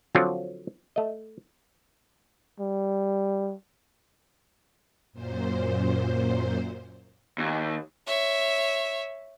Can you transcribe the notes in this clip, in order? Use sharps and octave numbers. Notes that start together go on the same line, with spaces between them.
D3 F3 F#3 C4 D4 F4
A3 D#5
G3
F#2 A#2 C5
D#2
C#5 E5